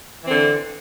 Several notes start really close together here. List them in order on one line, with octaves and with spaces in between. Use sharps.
E3 C4 D3